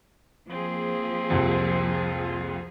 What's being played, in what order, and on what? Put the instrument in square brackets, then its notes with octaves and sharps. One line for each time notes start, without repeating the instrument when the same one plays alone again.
[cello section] F3 A#3 G#4 [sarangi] C4
[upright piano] C2 F2
[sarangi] F4